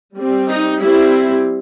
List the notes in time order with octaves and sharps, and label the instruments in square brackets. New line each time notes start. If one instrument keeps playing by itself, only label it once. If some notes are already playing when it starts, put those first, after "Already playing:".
[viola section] G3 C4
D#4
G3 C4 E4